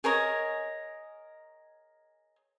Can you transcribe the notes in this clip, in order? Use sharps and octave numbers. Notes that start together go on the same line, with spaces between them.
G#4 A#4 C#5 D#5